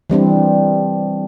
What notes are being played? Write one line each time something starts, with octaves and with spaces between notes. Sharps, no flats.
E3 G3 C4 D4